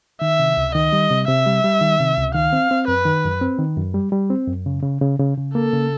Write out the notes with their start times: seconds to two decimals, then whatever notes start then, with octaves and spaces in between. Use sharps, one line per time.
0.22 D#3 E5
0.40 C3
0.57 C#2
0.75 D#3 D#5
0.93 G3
1.11 C3
1.28 C3 E5
1.46 G3
1.64 G3
1.81 D#3
2.00 C3
2.17 C#2
2.34 D#3 F5
2.53 C4
2.71 C4
2.88 F#2 B4
3.06 D#3
3.24 F#2
3.41 C4
3.59 D#3
3.77 F#2
3.94 G3
4.12 G3
4.30 C4
4.48 F#2
4.66 C#3
4.83 C#3
5.01 C#3
5.19 C#3
5.37 C#3
5.55 A#3 A4
5.73 C#3